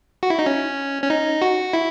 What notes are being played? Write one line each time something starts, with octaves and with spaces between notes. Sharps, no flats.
F#4
E4
D#4
C#4
C#4
D#4
F#4
E4